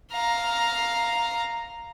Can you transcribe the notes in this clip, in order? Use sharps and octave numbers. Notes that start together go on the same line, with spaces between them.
F5 A#5